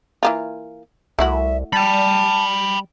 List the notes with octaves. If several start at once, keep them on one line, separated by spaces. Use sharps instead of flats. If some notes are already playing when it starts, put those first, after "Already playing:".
E3 A#3 F4
C2 A3 E4 F#4 E5
G3 G5 A5 B5